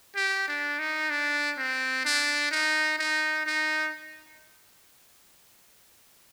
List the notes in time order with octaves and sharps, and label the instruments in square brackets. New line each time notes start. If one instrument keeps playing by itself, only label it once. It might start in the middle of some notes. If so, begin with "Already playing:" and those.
[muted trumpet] G4
D4
D#4
D4
C4
D4
D#4
D#4
D#4